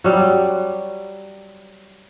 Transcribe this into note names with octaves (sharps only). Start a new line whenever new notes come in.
F#3 G3